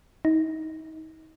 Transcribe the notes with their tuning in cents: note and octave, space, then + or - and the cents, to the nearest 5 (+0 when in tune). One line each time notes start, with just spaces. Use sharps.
D#4 +30